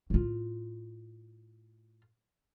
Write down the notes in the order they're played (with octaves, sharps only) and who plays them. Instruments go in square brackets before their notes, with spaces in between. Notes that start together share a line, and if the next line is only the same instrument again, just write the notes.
[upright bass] A2 F4